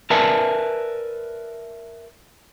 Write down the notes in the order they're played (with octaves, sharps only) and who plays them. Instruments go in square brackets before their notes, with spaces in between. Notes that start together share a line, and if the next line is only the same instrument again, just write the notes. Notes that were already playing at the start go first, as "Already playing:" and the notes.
[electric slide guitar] A#4 B4 D5 E5 G#5 A5